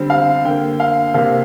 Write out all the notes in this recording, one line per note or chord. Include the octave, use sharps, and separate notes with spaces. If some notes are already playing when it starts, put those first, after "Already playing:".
Already playing: D3 G3 C4
F5
D3 A#3 G5
F5
C3 A#3 F5